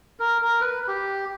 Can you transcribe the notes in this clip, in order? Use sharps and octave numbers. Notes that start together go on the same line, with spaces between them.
A#4
A#4
B4
G4